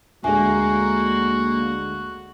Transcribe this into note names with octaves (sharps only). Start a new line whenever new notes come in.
D2 D3 G#3 A#3 F#4 E5 G#5